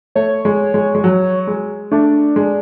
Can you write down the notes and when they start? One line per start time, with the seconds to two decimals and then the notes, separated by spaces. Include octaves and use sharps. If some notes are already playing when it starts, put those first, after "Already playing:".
0.15 A3 C#5
0.45 G#3
0.74 G#3
0.95 G#3
1.04 F#3
1.47 G#3
1.92 A3 D4
2.36 G#3